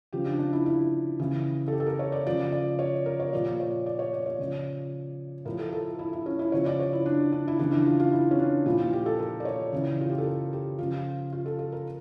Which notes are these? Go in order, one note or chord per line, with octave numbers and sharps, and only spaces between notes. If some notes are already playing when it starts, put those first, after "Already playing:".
C#3 F3 G4
D4
D4
E4
E4
C#3 E3
A4
G4
A4
A#4
C#5
D5
C#3 F3 D5
D5
C#5
A#4
C#5
A#2 F3 D5
C#5
D5
C#5
D5
C#5
C#3 F3
A2 F3 A#4
A4
A4
E4
E4
C#4
E4
C#3 F3 C#5
D5
C#5
E4
D4
D4
E4
C#3 E3 D4
D4
F4
F4
E4
C#4
D4
A#2 F3 E4
F4
G4
A4
A#4
D5
C#5
C#3 E3
F4
G4
A4
A#4
G4
C#3 F3 F4
F4
A4
A4
A#4